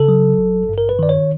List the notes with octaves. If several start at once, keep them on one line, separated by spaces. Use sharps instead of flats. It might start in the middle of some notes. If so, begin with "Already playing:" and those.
Already playing: C#3 A4
F#3
G#1
G2
A#4
B4
D#3 D5
C#5